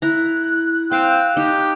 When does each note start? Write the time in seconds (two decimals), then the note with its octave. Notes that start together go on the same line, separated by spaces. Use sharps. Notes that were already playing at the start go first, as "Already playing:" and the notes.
0.02 E4 A#5 F#6
0.92 C4 F5 G5
1.37 D#4 G4